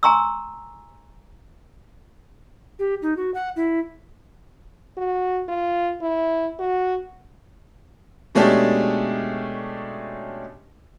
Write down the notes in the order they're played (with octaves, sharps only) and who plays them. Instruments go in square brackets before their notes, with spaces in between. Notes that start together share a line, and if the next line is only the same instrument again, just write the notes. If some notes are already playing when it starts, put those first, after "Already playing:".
[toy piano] G#5 A#5 C6 C#6 E6
[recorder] G4
D#4
F#4
F#5
E4
[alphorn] F#4
F4
E4
F#4
[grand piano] B2 G#3 A3 C#4 D4 G4